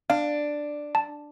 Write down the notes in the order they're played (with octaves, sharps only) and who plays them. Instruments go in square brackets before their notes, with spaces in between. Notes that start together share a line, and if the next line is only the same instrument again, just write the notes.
[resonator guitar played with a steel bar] D4 [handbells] F5
[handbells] A5